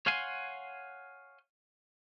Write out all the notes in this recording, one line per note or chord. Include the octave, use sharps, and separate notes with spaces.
C#5 F5 F#5 G#5 C6